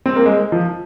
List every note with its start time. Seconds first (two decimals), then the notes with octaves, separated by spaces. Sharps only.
0.06 C4
0.16 A#3
0.26 G#3
0.52 F3